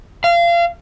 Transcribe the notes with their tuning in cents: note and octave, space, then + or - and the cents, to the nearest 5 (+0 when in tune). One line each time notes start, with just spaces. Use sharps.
F5 -30